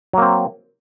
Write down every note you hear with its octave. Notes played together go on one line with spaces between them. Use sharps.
F#3 A#3 C4